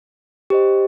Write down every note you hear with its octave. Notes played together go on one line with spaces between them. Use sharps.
G4 C5 D#5